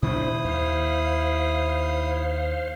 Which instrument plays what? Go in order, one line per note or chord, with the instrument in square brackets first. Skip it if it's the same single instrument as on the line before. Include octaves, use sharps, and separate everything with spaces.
[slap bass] A#2 D#3 D4 [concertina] E4 D#6 [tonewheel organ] C5
[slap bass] D#2 [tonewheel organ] C5 F5